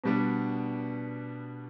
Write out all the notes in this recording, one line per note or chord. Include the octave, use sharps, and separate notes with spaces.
B2 G3 B3 D4